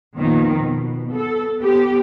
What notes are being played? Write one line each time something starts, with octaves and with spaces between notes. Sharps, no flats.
F2 A#2 D#3 B3
B2
B3 A4
B3 G4